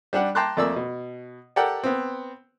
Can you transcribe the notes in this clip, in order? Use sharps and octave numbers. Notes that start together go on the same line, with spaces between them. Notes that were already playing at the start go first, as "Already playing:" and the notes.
G3 D4 G4 F#5
G5 A5 A#5 C6 D6 F#6
F2 A3 A#3 D5 G#5 E6
B2
G4 A4 A#4 D5 F#5 G5
B3 C4